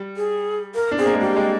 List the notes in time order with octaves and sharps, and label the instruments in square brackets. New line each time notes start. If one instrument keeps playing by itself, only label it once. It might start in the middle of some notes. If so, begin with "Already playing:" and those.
Already playing: [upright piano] G3
[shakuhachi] G#4
A#4
[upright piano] D4
[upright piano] C4 [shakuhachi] G#4
[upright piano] A#3
G#3
[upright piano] G3 [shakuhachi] G4
[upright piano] G#3